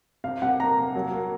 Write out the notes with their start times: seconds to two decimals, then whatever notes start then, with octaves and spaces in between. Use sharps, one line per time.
0.24 C3 F5
0.42 C3 F#5
0.60 A#3 A#5
0.78 A#3
0.95 F#3
1.12 A#3